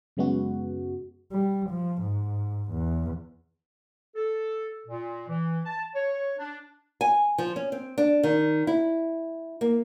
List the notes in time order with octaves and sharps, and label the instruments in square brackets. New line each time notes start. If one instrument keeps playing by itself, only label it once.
[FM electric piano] F#2 C#3 G#3 B3 F#4
[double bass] G3
F3
G#2
E2
[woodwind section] A4
A#2
E3
A5
C#5
D4
[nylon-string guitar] G#5
F3
C#4
C4
D4
D#3
E4
A#3